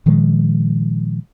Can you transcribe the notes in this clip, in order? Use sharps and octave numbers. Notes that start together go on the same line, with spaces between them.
A#2 D#3 F3 G#3